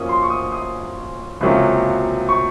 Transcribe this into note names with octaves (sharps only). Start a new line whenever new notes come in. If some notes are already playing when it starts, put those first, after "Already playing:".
Already playing: F#2 F3 A#3 C#4 D#6
C6
C#6
D#6
D#6
C#2 C3 F#3 A#3 C#4
C#6